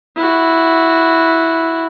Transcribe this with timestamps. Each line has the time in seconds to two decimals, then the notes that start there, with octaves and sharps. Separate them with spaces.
0.17 E4 F#4